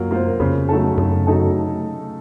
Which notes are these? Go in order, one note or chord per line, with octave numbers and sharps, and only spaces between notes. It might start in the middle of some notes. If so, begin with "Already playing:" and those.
Already playing: F#2 F#3 A#3 F4
A#3 F4 C5
F2 C#3
F#3 A3 D#4 A4
F#2 C#3
F#3 A3 D#4 A4